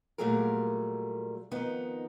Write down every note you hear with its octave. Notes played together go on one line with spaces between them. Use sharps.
A#2 F#3 G3 A3 G#4 A#4
F2 D#3 B3 D#4